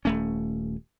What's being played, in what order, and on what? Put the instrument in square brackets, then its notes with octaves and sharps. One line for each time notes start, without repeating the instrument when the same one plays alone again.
[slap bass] D#1 A3 C#4